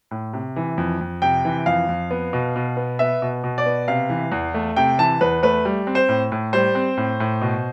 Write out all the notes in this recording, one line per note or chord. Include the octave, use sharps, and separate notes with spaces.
A2
C3
E3
F2
F2
C3 G5
E3
F2 F5
F2
B3
B2
B2
B3
B3 E5
B2
B2
D5
B3
C3 F5
E3
E2
A3
C3 G5
E3 A5
E2 B4
A3 B4
G3
C4
C5
A2
A2
G3 C5
C4
A2
A2
B2